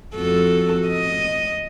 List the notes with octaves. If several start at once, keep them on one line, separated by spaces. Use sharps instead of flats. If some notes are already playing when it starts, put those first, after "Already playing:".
F2 F#4 A4
D#5